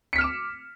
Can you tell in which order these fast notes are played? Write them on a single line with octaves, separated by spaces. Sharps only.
C#7 B6 F6 E7 D6